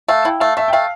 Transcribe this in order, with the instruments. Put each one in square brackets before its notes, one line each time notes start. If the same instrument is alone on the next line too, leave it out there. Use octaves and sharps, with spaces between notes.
[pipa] A3 [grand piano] F5
[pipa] E4 [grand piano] G5
[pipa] A3 [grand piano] F5
[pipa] A3 [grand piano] E5
[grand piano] G5
[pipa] A3 [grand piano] F5